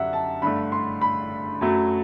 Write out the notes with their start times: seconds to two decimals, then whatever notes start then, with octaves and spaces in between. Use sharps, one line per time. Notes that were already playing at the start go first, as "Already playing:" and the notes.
Already playing: F#2 D3 G3 E5 F#5
0.13 A5
0.42 G2 D3 A3 B5
0.72 C6
1.01 B5
1.61 F#2 F#3 A3